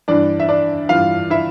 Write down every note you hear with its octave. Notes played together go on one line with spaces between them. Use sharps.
G2 E3 D4 D5
E5
D4 D5
G2 E3 F4 F5
E4 E5